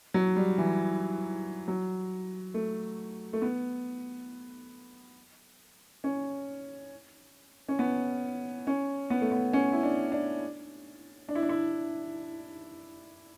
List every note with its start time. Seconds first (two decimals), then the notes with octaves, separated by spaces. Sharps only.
0.14 F#3
0.36 G3
0.58 E3
1.68 F#3
2.54 A3
3.33 A3
3.42 B3
6.04 C#4
7.69 C#4
7.79 B3
8.67 C#4
9.10 B3
9.21 A3
9.32 B3
9.53 C#4
9.73 E4
9.83 D4
10.12 D4
11.29 D4
11.35 E4
11.43 D4
11.49 E4